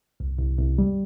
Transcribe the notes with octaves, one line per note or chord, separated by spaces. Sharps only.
C2
C2
C2
G3